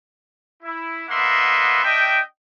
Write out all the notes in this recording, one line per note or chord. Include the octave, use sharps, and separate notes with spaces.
E4
A#3 B3 D#5 E5 F#5 C6
D4 D#5 E5 G5